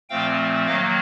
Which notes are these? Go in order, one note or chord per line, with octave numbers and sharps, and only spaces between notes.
A#2 F3 A3 C4 F5 G5
D#3 F#3 A#3 D#5 F5